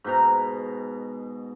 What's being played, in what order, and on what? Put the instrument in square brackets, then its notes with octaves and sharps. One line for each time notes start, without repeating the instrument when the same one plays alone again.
[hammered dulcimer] G#2 B2 A#5